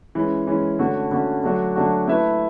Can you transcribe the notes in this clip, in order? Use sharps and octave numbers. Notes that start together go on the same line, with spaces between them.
E3 G#3 C#4
E3 G#3 C#4
D3 A3 C#4 F#4
D3 A3 C#4 F#4
D3 F#3 A3 D4 F#4
D3 F#3 A3 D4 F#4
A3 E4 B4 E5